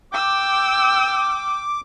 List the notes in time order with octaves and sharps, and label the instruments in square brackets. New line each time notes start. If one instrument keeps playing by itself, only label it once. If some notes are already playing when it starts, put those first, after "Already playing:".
[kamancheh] G5 E6 [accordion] D6